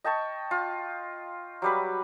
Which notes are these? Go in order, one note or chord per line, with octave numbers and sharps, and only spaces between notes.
D#5 G5 A5 C#6
F4
F#3 G3 B4